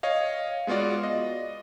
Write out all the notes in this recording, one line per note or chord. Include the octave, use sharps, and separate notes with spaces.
C#5 D#5 F5
G#3 B3 F4 F#4 D5
D#5